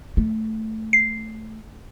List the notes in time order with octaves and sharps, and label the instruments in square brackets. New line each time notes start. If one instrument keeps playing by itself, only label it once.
[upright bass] A3
[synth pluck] C7